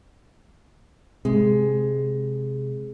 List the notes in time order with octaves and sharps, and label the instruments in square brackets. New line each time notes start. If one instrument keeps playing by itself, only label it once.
[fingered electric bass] C3 [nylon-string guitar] G#3